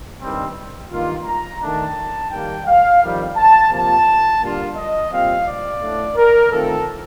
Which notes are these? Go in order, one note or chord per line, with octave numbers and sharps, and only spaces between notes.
G2 D#3 G3 C4
G2 D#3 A#3 F4
A#5
D#3 A3 D4 A5
D#3 G3 A#3 G5
F5
F2 D#3 G3
A5
C3 F3 A#3 F4 A5
D3 G3 A#3 D4 F4
D#5
A#2 G3 C4 F4 F5
D5
A2 A3 D4
A#4
D#3 A3 C4 F4 A4